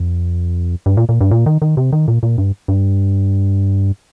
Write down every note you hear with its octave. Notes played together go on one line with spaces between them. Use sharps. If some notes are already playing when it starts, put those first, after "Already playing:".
Already playing: F2
G2
A#2
A#2
G2
A#2
D#3
D#3
C3
D#3
A#2
A#2
G2
G2